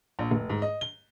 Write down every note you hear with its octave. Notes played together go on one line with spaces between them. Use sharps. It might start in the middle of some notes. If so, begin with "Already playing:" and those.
A#1
F1
G#2
D#5
G7